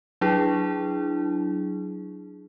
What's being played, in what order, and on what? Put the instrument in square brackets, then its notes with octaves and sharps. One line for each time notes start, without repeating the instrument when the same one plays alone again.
[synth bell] F#3 D4 E4 G#4